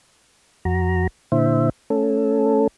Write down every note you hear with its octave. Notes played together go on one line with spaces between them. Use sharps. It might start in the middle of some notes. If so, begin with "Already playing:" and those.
F2 F#4 A#5
A#2 D3 E4 C5 E5
A3 C#4 A4